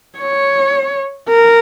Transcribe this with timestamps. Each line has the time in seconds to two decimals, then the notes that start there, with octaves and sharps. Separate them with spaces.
0.18 C#5
1.29 A#4